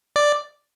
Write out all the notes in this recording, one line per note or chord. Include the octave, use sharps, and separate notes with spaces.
D5